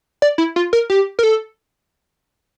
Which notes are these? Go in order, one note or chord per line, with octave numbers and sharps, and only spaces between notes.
D5
E4
F4
A#4
G4
A#4
A4